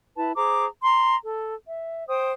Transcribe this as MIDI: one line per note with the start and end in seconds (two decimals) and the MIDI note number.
0.17 0.32 64
0.17 0.32 71
0.17 0.32 81
0.36 0.66 68
0.36 0.66 72
0.36 0.66 82
0.36 0.66 86
0.84 1.16 82
0.84 1.16 84
1.23 1.54 69
1.67 2.07 76
2.08 2.32 72
2.08 2.32 79
2.08 2.32 87